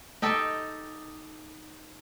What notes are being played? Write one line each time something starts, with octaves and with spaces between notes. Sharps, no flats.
D#4 G4 A4 G5